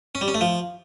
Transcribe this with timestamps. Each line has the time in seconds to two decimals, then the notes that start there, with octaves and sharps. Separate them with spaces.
0.15 C#4
0.21 G3
0.28 C#4
0.34 A3
0.41 F3